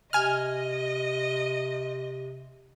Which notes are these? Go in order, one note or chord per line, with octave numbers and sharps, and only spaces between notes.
C3 D#5 G#5 F6